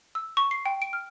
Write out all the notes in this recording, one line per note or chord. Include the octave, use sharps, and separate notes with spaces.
E6
C#6
C7
G5
D7
F6